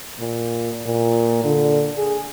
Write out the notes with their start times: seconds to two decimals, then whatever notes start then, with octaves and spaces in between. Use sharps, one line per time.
0.19 A#2
0.86 A#2
1.44 D3
1.97 G#4